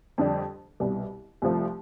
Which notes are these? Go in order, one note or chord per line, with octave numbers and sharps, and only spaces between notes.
F2 D3 G3 D4 G4
C2 B2 G3
C2 C3 F3 A3